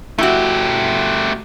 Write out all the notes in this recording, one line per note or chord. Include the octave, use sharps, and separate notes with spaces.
A3 E4 F#4 G4